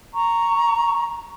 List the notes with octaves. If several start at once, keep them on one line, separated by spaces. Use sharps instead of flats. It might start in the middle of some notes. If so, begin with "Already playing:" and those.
A#5 C#6